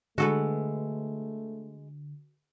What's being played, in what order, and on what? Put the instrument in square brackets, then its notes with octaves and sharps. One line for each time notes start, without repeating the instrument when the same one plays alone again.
[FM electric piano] D3 [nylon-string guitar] G#3 [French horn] A3 [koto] F#4 A4 B4